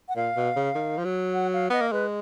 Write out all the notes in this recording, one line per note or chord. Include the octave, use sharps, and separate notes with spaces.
F#5
A#2 F5
B2
C#3
D#3
F3
F#3
F#5
F5
B3 D#5
A#3
G#3 B4